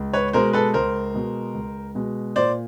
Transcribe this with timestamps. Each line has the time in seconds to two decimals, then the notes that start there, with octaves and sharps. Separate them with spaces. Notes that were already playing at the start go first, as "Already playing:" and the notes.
Already playing: C#2
0.13 B4 C#5
0.33 B2 G#3 A#4 C5
0.53 A4 B4
0.74 C#2 A#4 C5
1.14 B2 G#3
1.54 C#2
1.95 B2 G#3
2.36 A#2 C5 D5